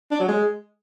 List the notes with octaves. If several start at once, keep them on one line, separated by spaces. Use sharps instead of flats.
D4
F#3
G#3